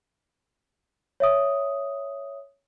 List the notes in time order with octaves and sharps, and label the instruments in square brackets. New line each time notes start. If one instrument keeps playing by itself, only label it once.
[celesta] C#5 E5 D#6